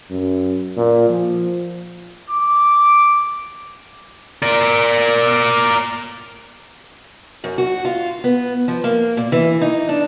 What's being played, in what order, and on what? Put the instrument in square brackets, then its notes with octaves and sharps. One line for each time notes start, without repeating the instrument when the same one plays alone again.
[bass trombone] F#2
A#2
F3
[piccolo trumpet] D6
[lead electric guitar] A#4 D5
[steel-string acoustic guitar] F#2
F#4
F4
B3
F3
A#3
A#2
E3
D#4
D4